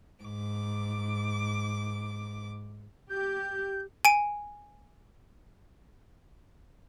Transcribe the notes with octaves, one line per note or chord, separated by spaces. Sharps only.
G#2 D6
G4 G6
G#5 D7